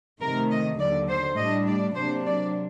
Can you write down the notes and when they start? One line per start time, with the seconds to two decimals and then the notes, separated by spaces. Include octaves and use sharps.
0.21 C3 D#3 A3 A#4
0.51 D#5
0.80 D#2 D3 F#3 D5
1.09 C5
1.37 A2 G3 D4 D#5
1.67 D5
1.96 C3 F#3 A#3 D4 C5
2.26 D5